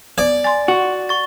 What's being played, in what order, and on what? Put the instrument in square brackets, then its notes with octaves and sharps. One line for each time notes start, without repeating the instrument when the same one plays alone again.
[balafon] B3 [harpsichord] D5
[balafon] G#5 C6 [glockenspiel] A6
[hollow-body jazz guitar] F#4
[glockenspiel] C#6 A6